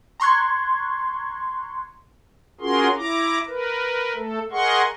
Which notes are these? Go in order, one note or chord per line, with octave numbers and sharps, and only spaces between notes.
A#5 C6 C#6 F#6 G#6
C#4 F4 F#4 G#4 A#4 C6
E4 A#5 D6
A#4 B4
A3 A4
G#4 A#4 D#5 F#5 C6 C#6